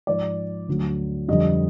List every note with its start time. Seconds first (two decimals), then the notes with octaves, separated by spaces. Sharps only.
0.07 G#2 F3 D5
0.68 D2 D3 F#3
1.28 F2 D3 G3 D#5